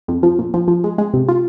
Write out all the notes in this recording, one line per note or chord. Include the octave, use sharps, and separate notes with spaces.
F2
F3
A#2
F3
F3
G#3
G#3
C3
F4